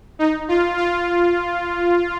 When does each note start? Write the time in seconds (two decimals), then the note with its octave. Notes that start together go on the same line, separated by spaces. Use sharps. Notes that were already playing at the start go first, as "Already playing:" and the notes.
0.19 D#4
0.48 F4
0.77 F4